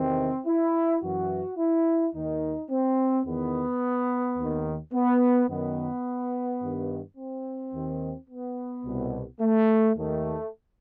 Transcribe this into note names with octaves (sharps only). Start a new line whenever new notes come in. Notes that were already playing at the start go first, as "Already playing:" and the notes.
Already playing: E2 C3 D#3 C4
E4
F#2 E3 F#4
E4
D#2 D#3 D#4
C4
E2 D#3 B3
D#2 D#3
B3
F#2 D#3 B3
G2 D#3
C4
D#2 D#3
B3
C2 B2
A3
D#2 D#3 A3